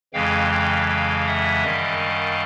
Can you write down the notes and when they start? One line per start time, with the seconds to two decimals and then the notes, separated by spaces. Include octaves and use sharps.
0.13 F2 C#3 E3 G#3 F5 G5
0.51 F5 G5
0.88 F5 G5
1.26 E5 F#5
1.63 F#2 D#3 G3 D#5 F5